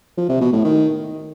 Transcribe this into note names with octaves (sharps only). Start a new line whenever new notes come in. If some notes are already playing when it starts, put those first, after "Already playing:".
F3
C3
B2
A2
D#3